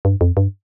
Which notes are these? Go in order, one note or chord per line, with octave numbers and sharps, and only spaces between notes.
G2
F2
G2